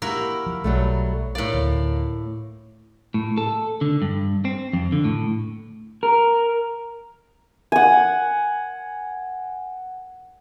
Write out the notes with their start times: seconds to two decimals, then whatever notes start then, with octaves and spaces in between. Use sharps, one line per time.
0.02 A#3 E4 F#4 G4 A#4
0.46 F3
0.64 B1 F#3 G3 A3
1.35 A2 A#3 D5
1.53 D2
3.14 A2
3.38 A4
3.81 D3
4.02 G2
4.45 C4
4.73 F2
4.92 D3
5.04 A2
6.03 A#4
7.72 F#5 G#5